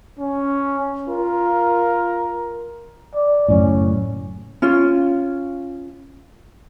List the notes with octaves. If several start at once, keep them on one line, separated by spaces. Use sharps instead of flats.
C#4
F4 A#4
D5
F#1 F#2 A2 C#4
C#4 F4